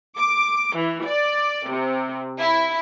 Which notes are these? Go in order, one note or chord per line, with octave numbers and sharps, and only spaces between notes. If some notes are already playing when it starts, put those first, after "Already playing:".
D6
E3
D5
C3
E4